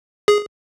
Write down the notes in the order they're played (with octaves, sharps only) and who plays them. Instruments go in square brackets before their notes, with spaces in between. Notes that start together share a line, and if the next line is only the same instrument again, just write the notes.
[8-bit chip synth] G#4